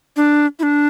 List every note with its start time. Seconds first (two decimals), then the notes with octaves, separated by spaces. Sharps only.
0.16 D4
0.59 E4
0.63 D4